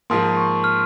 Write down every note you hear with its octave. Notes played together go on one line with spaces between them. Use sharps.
G#2 F3 A#3 C6
C#6
F6